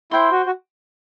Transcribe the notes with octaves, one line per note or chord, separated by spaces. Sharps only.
E4 C5 G5 C6
F#4
F#4